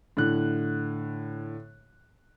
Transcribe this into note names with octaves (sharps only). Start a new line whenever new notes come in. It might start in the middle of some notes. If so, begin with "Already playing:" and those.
A2 D3 F#6